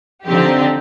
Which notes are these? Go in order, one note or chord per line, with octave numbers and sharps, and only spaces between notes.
D3 F3 C4 D#4 G4